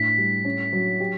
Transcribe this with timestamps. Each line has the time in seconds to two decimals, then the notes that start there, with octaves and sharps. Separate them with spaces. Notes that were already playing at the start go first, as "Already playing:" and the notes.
Already playing: A2 D4 B6
0.18 G3
0.45 C#4
0.73 F#3
1.00 G4